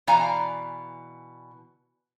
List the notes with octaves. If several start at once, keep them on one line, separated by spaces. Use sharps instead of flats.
B2 E3 D5 F5 G#5 A#5